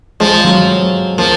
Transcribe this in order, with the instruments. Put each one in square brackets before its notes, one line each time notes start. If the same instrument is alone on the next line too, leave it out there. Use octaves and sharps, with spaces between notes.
[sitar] F3 [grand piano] G#3
[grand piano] F#3
[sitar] F3 [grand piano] A#3